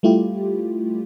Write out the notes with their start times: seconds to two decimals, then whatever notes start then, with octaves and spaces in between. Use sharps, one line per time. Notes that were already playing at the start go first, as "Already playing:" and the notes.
0.03 G3 A3 E4 F4 G4